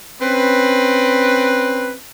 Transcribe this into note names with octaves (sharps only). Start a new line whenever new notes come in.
C4 C#4 B4